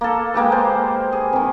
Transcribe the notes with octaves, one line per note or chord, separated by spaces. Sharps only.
A#3 A4
G#3 A#3 G4 B4
C5
G#4
C3 D#3